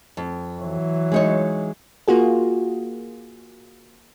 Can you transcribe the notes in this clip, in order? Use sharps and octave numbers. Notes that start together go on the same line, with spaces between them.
F2
E3 F#3
G#3 D#4 C#5
A#3 F4 F#4 G#4